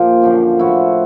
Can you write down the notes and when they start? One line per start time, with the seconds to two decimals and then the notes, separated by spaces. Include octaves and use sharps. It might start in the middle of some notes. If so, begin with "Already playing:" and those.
Already playing: A#2 F3 F4 G4
0.22 F#2 D3 F3
0.59 A2 F3 E4 F#4